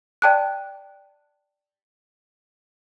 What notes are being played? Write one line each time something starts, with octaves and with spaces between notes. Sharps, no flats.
D5 G5 A5 D6 F#6